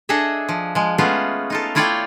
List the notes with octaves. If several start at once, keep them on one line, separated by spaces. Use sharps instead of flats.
D4 G#4 A4 D#5 E5
F3
F3 G#3
G#3 A3 B3 C#4 F4 G#4
D#4 F4 A4
A3 E4 F4 C#5 D5 G5